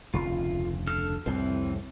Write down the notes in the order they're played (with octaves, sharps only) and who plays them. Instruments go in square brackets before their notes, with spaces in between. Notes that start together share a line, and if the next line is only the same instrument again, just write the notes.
[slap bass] F1 D2 C#3 [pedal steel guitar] F4
[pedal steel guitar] D4 A4 F6
[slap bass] C2 F2 A2 [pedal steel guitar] E3 C4